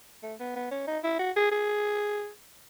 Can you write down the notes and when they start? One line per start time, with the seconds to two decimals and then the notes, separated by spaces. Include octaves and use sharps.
0.23 A3
0.40 B3
0.56 B3
0.71 C#4
0.87 D#4
1.04 E4
1.19 F#4
1.36 G#4
1.51 G#4